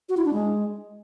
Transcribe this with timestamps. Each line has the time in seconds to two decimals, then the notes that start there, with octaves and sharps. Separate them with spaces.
0.09 F#4
0.17 E4
0.25 D4
0.33 G#3